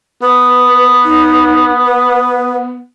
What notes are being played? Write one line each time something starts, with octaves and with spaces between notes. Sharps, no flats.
B3 B4
D#4
B4